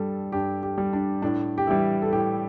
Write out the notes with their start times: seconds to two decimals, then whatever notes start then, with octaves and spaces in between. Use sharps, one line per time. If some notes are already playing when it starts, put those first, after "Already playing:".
Already playing: G2 G3 A4
0.32 G2 G4
0.63 G4
0.78 G3
0.93 D4
1.22 A2 D4
1.58 G4
1.67 E3 G3 E4
2.02 A4
2.12 A2 G4